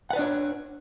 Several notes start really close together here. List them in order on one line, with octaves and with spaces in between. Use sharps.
F#5 B4 D5 D4 C#5